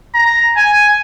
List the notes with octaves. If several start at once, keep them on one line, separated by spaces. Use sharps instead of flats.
A#5
G#5